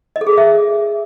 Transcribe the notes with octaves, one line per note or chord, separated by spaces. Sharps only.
D#5
A4
G#4
A#4
E5